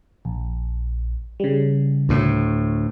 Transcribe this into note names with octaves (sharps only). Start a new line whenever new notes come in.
A#1
C#3 G3
D2 A2